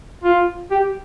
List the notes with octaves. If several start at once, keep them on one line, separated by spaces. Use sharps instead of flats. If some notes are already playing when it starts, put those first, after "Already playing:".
F4
G4